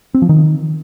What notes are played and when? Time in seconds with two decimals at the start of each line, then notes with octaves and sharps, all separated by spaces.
0.15 C4
0.22 F3
0.29 D#3